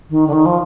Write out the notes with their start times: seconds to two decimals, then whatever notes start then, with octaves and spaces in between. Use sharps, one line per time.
0.10 D#3
0.27 D3
0.33 D#3
0.46 F3